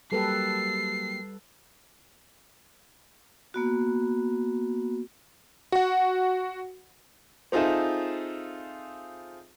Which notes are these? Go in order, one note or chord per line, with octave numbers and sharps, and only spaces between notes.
F#3 G3 A#3 G4 A4 B4 C7
A#3 B3 F#4
F#4 F#5
C4 D#4 F4 G#4 A4 E5